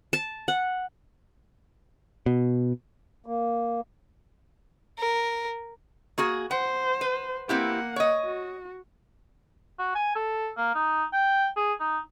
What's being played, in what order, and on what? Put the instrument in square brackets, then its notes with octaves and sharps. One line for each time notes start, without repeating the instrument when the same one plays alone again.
[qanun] A5
F#5
[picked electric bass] B2
[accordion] A#3
[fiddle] A#4
[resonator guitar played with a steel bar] A#3 F#4 G#4
[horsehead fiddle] C5 [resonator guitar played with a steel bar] F#5
[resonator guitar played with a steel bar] B4
[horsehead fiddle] A#3 F#5 [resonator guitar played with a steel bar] C4 E4 G4
[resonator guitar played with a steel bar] C#5 D#5
[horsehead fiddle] F#4
[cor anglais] F#4
G#5
A4
A#3
D#4
G5
G#4
D#4